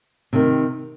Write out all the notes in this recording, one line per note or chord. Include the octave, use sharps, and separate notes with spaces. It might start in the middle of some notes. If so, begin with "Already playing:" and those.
C3 D#3